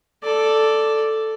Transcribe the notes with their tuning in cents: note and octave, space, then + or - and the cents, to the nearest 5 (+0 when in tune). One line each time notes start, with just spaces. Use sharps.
A4 +0 D5 +0